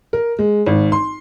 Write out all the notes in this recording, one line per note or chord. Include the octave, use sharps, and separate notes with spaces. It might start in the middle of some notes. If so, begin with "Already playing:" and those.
A#4
G#3
G#1
C6